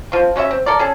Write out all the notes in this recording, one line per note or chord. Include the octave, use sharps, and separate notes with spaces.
F3 C4
F#3 C#4 F4 E5
C4
A4 A#4 D5
C#4 G#4 A4